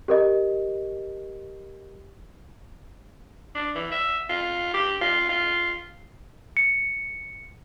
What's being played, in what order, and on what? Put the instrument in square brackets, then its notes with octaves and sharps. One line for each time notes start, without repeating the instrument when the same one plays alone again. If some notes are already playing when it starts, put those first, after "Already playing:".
[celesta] G4 A#4 D#5
[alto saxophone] D4
E3
E5
F4
G4
F4
F4
[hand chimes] C#7